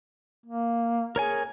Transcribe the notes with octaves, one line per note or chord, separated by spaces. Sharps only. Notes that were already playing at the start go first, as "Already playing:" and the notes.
A#3
G#4 A#4 C#5 G#5